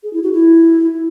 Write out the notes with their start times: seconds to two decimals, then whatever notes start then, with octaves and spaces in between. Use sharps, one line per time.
0.03 G#4
0.13 E4
0.23 F#4
0.33 E4